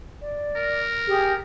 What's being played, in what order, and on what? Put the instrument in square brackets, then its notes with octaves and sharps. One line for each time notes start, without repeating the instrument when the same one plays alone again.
[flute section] D5
[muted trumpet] A#4
[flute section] G4 G#4